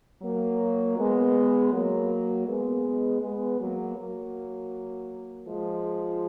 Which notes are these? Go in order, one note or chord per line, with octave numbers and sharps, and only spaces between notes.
F#3 A#3
G#3 B3
F#3 A#3
G#3 B3
G#3 B3
F#3 A#3
F#3 A#3
F3 G#3